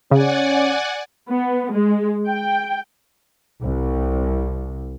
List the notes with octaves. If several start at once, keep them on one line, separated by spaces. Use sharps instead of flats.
C#3 C#4 D5 F#5 G#5
B3
G#3
G5
C2